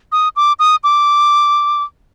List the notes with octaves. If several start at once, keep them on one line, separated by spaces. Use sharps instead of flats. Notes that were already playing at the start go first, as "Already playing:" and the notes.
D#6
D6
D#6
D6